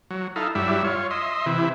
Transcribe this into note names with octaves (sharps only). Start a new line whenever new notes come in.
F#3
D#4 E4 A4 F5
G2 F#3 G3 E4 E5
F4 C#5
D#5 E5 C6
C3 E3 E4